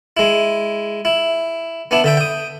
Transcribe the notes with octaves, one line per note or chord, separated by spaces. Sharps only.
G#3 E4
E4
B3 D4 E4
D3 E5 G5
G5 D#6